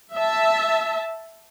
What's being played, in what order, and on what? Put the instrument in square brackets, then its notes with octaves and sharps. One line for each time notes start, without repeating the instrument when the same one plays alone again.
[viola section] E5 A5